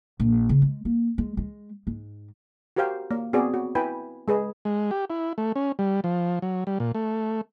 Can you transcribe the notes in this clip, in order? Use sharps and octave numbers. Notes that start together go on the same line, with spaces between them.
A#1
C#3
G#3
A#3
G#3
G#3
G#2
F#4 G4 A#4 C5 F5 G5
A#3
B3 C4 F#4 G#4 D5
F#4
E4 B4 G5 G#5 B5
G#3 G#4 B4 D#5
G#3
G4
E4
A3
C#4
G3
F3
F#3
G3
A#2
A3